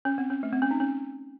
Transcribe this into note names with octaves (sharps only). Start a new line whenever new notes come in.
C#4
C4
C#4
A3
C4
C#4
D#4
C#4